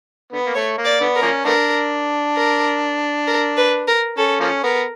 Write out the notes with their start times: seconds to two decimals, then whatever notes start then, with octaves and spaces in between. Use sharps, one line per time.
0.32 D3 B3
0.46 A#3
0.55 A3 C#5
0.78 A#3
0.85 D5
1.01 D3 B3
1.15 A#4
1.22 F3 A#3 C#4
1.45 A3 B3 D4 A#4
2.36 A#4
3.27 A#4
3.57 B4
3.88 A#4
4.17 C#4 A4
4.40 F3 A#3 C#4
4.63 B3 A#4